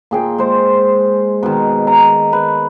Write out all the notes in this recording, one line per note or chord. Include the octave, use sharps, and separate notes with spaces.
A#2 G#4 G5
G#3 C5
B2 D#3
A#5
B4